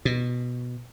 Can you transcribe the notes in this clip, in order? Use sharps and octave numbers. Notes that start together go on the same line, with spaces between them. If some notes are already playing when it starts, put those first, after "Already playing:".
B2